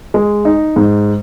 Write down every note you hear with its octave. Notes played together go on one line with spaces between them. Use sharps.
G#3
D#4
G#2